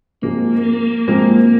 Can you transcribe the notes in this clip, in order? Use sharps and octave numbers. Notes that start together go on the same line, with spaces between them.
G#2 F3 G#3 A#3 C4
G#2 F3 G#3 A#3 C4